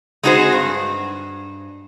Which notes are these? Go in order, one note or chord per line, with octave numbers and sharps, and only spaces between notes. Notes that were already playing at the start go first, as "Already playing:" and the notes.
G#3 C4 D#4 F#4 G#4 C5
G2